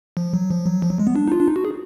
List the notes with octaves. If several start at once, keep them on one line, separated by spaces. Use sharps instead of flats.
F3
F#3
F3
F#3
F3
F#3
G#3
B3
D4
D#4
F4
D4
D#4
F#4
G#4